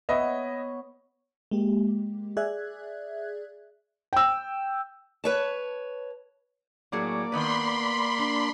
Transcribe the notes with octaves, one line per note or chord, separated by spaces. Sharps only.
B3 B4 C#5 D#5 E5
G#3 A#3 G4
G#4 D5 E5 F#6 G#6
G5 E6
B4 C#5 A5
A2 F#3 A#3 G#4 D5
D#3 B3 B4 B5 C6
D4